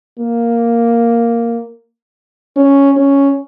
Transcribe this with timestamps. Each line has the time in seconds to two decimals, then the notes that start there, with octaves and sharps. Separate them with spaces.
0.19 A#3
2.56 C#4
2.97 C#4